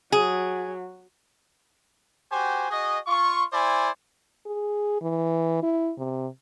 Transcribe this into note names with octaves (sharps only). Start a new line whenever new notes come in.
F#3 G#4
F#4 G4 C5 G#5
F#4 G#4 D#5
F4 C#6
E4 C5 D5 G#5
G#4
E3
E4
C3